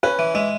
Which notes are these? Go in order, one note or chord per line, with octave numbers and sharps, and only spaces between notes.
C#4 B4
E3
G#3 E5